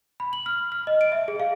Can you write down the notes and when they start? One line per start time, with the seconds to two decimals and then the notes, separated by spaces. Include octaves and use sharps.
0.20 B5
0.33 F#7
0.46 F6
0.72 F6
0.87 D#5
1.01 D7
1.12 E5
1.28 G#4
1.40 F5